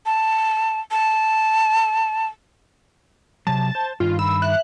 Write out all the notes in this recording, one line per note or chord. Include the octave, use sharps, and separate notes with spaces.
A5
A5
C3 F#3 A5
C5
G2 D#3 F4
B5 E6
E5 F#6